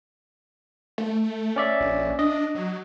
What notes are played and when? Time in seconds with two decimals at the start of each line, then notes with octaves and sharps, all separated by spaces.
0.98 A3
1.56 C#4 D5 E5
1.80 A#1
2.19 D4 D#5
2.55 F#3